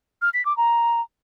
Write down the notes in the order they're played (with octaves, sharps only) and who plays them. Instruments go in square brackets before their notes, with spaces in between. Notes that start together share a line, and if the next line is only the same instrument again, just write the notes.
[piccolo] F6
B6
D6
A#5